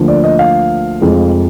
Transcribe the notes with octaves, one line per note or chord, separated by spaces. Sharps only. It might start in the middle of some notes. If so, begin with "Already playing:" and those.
Already playing: D2 D3 F3 A#3
D5
D#5
F5
F1 F2 F3 G#3